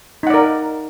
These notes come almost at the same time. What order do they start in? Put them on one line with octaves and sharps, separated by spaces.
D#4 F#5 D5 A#4